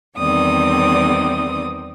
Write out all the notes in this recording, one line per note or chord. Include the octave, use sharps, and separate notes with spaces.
E2 D#3 G3 C4 D5 D#6